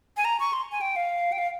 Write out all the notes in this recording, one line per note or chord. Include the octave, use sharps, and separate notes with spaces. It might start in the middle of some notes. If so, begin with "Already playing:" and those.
G#5
A#5
C#6
C6
G#5
G5
F5
G5
F5